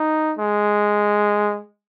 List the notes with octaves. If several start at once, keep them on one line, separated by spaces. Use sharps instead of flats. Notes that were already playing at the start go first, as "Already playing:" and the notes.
Already playing: D#4
G#3